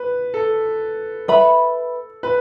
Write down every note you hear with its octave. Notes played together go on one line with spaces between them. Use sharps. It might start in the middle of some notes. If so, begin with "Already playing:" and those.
Already playing: B4
A4
B4 E5 B5
B4